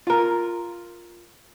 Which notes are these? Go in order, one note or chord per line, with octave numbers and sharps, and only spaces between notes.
F4 A#4